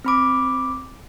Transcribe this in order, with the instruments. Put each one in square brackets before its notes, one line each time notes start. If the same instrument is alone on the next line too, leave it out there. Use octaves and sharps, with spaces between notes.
[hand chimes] C4 B5 D6